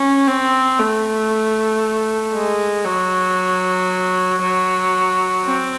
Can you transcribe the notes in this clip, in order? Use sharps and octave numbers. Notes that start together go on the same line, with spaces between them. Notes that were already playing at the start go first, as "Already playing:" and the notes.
Already playing: C#4
C4
A3
G#3
F#3
F#3
C4